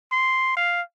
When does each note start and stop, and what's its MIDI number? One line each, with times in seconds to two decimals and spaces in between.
0.12 0.56 84
0.57 0.82 77